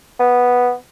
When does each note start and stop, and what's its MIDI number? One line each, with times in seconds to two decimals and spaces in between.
0.20 0.73 59